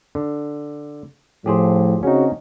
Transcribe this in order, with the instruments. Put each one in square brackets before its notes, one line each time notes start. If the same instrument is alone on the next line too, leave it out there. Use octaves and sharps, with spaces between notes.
[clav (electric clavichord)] D3
[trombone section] A2 F3 [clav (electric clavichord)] G4 G#4 C5
[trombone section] C#3 C4 F#4 [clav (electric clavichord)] C#4 D#4